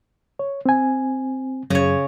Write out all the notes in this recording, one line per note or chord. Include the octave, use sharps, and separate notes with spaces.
C#5
C4 G#5
F#2 C#3 C#5